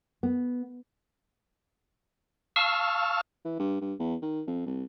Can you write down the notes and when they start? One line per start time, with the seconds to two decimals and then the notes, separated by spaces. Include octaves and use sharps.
0.23 B3
2.56 F5 A5 C#6 E6 F6
3.45 E3
3.59 G2
3.81 G2
3.99 E2
4.22 D#3
4.47 F2
4.66 C2